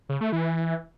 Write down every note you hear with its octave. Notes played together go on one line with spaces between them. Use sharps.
C#3
A3
E3